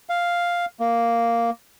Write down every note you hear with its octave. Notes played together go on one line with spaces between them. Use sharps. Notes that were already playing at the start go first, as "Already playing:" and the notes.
F5
A#3